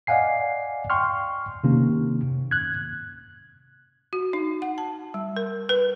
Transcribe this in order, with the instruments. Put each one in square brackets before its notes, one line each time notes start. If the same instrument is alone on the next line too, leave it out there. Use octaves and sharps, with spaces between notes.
[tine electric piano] D5 D#5 F5 F#5 G#5 C7
G5 C6 C#6 F6
C3 D#3 A#3 C#4
F#6 G#6
[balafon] F#4
D#4
F#5
A5
G3
A#4
B4